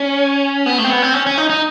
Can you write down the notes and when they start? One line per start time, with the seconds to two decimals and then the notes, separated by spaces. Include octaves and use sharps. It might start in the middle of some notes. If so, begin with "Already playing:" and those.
Already playing: C#4
0.66 B3
0.78 A3
0.84 C4
0.90 B3
1.02 C4
1.14 C#4
1.26 C#4
1.38 D#4
1.50 D#4